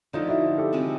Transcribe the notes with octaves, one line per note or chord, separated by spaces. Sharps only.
D3 F3 A3 D#4 F4
E4 F#4
G4 A4
C3 F3 G#3 C4